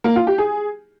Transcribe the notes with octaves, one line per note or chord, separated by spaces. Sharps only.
A#3
F4
G4
G#4